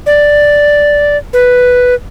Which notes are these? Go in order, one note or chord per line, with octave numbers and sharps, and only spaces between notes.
D5
B4